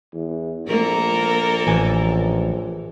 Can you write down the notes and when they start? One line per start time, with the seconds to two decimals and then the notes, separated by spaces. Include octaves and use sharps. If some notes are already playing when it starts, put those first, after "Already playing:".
0.14 E2
0.67 A#1 A#3 A4 A#4
1.67 A1 G#5